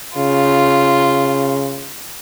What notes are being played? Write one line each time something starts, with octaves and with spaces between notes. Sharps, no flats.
C#3 F4